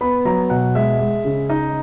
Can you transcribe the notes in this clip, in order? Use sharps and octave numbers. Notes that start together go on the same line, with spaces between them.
B3 B5
F#3 A#5
B2 F#5
G#3 E5
G#3
C#3
D#4 D#5